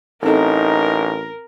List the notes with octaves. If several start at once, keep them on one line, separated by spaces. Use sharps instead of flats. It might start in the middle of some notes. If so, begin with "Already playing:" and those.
A1 C4 D#4 A4 A#4